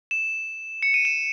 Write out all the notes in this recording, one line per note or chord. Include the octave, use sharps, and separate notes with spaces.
E7
C#7
D#7
E7